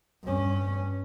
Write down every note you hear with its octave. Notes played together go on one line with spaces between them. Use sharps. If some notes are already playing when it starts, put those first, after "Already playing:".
G2 C#4